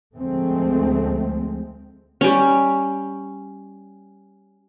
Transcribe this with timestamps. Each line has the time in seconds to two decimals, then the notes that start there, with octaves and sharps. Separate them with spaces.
0.17 D2 F3 G#3 A3 C4
2.21 G3 C#4